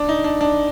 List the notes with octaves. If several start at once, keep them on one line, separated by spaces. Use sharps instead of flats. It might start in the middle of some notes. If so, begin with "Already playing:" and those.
Already playing: D4
D#4
D4
D4